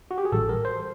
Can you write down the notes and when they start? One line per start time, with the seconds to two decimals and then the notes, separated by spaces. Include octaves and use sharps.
0.11 F#4
0.18 G4
0.25 G#4
0.32 A1 A2 E3 G3 A4
0.49 A#4
0.65 C5